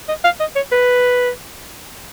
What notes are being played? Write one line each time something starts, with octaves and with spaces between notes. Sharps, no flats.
D#5
F5
D#5
C#5
B4